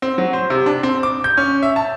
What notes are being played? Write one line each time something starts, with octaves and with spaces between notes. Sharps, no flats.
C4
F#3
C5
C3
D4
C4
D6
G6
C#4
E5
A5